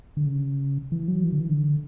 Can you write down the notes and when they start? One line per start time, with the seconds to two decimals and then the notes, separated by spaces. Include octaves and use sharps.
0.17 D3
0.26 C#3
0.92 E3
1.08 F#3
1.24 E3
1.32 D3
1.40 E3
1.49 D3